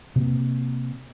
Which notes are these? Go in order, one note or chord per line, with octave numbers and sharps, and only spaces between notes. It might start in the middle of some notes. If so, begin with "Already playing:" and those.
C3 A#3